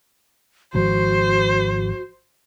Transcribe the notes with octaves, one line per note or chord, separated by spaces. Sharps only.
G#1 F3 F#4 C5